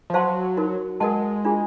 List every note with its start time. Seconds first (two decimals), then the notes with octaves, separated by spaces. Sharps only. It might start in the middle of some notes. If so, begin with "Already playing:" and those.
0.10 F3
0.14 F#3 C5 F5 A5 C6
0.57 D#4 F#4 A#4
1.00 G#3 A#4 D#5 F#5 A5
1.45 D4 F4 G#4